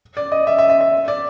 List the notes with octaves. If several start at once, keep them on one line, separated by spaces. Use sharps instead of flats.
D5
D#5
E5
E5
E5
E5
D5